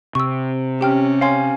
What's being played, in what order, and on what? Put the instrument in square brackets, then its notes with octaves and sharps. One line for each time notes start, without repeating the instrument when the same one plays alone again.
[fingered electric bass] C3 [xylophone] C#6 E6
[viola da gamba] C#4 [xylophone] G4 G5 F6
[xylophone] C#5 C6 [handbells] F5 G#5